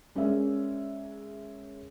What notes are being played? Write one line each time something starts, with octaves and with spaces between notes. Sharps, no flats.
G#3 C#4 G#4 A#4 D5 E5